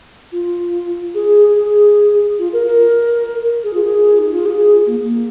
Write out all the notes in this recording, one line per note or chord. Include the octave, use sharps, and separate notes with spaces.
F4
G#4
G#4
F4
A#4
A#4
G#4
F4
G#4
D#4
F4
G#4
A#3
A#3